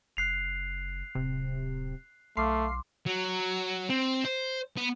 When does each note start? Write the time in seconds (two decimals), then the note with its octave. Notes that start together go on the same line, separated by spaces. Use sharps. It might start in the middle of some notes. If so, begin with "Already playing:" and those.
0.17 F#1 F#6 C7 F7
1.15 D1 C3
2.37 B1 A3 F5 C6 D6 C7
3.06 F#3
3.90 C4
4.24 C5
4.77 B3